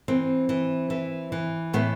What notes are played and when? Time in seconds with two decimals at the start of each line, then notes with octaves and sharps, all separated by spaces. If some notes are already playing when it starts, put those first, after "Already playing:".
0.08 E3 C4
0.49 E3
0.90 E3
1.32 E3
1.73 A2 B3